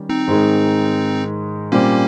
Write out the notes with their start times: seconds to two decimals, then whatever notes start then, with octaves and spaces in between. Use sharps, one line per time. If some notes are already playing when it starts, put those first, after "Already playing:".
Already playing: D#3 G3 C#4
0.09 C4 D#4
0.28 G#2 D#3 G#3
1.72 A#2 G3 A#3 C4 C#4 G4